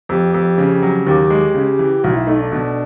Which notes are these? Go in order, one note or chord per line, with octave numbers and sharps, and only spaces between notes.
F2 G4
F2
C#3
F#3
D#2 G4
G#3
C#3
E3
B1 F#4
E4
A3 D#4
D4
B2 D4